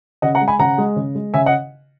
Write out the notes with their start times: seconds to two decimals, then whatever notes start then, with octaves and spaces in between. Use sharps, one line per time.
0.22 C#3 D#5 F#5
0.35 F#5 A#5
0.41 G#3
0.48 G#5 B5
0.59 C#3 F#5 A#5
0.78 G#3
0.96 C#3
1.15 G#3
1.34 C#3 E5 G#5
1.46 D#5 F#5